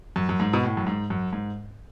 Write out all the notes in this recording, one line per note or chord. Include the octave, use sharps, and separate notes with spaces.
F#2
F#2
G#2
B2
A2
F#2
G#2
F#2
G#2